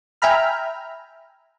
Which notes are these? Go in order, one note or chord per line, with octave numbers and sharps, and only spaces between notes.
E5 G5 G#5 A#5 B5 F6